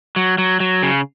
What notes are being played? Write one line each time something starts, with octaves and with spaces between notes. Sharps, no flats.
F#3
F#3
F#3
C#3